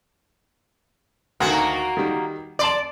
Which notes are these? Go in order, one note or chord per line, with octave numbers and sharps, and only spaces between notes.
D2 D#3 A#3 F#4
D#3 G3
D5 A5 C6 D6